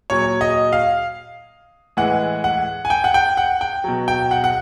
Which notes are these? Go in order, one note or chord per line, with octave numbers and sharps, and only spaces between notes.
A#2 F#3 C#5
D#5
F5
A2 E3 G#3 F#5
F#5
G#5
G5
F#5
G5
F#5
G5
B2 F#3
G5
F#5
F#5